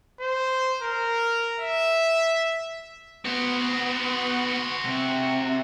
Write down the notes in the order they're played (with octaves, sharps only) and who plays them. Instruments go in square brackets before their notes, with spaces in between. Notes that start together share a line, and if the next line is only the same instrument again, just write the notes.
[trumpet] C5
A#4
E5
[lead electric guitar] B3 [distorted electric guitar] F#4 C5
[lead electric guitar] C3